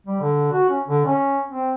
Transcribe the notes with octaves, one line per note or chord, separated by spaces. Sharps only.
G3
D3
F#4
C#4
D3
C#4
C4